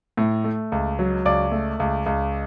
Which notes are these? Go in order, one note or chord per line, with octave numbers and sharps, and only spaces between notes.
A2
A3
C#2
F#3
C#2 D5 D6
A3
C#2
C#2